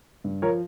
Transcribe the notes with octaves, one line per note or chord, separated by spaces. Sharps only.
G2
F3 A#4 C#5